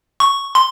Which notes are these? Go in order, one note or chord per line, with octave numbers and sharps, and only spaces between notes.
C#6
C6